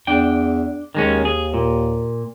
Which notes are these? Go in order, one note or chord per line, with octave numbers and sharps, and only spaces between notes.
E2 D4 G5
D#2 D#3 G#3 C#4
G#4
A#2